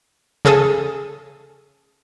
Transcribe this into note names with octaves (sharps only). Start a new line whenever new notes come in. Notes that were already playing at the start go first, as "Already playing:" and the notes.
C#3 G#4 A4 D#6